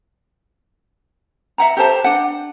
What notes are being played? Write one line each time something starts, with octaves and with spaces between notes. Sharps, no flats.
E5 F#5 A#5
G4 A4 C5 A5
D4 F#5